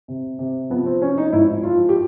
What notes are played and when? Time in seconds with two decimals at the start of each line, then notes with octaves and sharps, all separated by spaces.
0.08 C3
0.39 C3
0.70 F3 B3
0.86 C4
1.01 F3 C#4
1.18 D#4
1.32 G#2 E4
1.63 F3 F4
1.89 G4